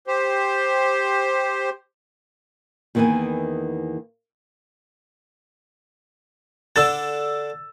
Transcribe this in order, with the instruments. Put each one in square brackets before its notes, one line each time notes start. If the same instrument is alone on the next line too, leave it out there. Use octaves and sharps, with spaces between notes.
[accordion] G4 C5
[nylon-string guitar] E2 D#3 A#3 E4 B4 G#5
[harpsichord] D3 D4 A4 [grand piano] E6 A6